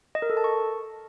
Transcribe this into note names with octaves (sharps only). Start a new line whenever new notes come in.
D#5
A#4
A4
A5
C#6